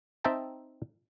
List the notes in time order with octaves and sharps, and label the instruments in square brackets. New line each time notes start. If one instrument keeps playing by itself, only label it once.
[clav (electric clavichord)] C4 D#4 E5 G5 A5 A#5